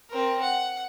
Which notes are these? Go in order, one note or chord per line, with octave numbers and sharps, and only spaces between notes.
C4 A#4
F#5